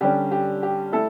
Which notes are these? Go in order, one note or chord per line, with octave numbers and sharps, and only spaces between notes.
D3 G3 C#4 G4
G4
G4
A3 E4 A4